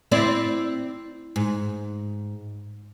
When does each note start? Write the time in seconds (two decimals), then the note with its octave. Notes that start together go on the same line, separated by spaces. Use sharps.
0.12 C4 E4 D5
1.36 G#2